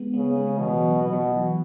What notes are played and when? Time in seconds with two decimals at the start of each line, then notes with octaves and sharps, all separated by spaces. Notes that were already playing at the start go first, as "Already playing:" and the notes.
Already playing: G#3 B3
0.14 C#3 B3
0.24 G#3
0.36 B3
0.47 G#3
0.58 B2 E3
0.69 E3
0.81 F#3
1.02 B2 B3
1.13 F#3
1.25 E3
1.36 E3